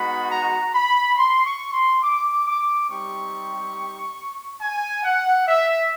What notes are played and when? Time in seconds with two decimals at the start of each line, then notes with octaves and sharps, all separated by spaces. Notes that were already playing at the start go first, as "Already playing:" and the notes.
Already playing: G#3 B3 D#4 F#4 B5
0.30 A#5
0.73 B5
1.16 C6
1.45 C#6
1.74 C6
2.02 D6
2.46 D6
2.88 G3 C4 D#4 G4 C#6
4.61 G#5
5.04 F#5
5.47 E5